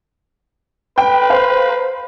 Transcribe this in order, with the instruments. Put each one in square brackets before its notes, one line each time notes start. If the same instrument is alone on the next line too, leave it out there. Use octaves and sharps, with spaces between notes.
[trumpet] B4 [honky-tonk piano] G5
[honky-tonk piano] C5 F5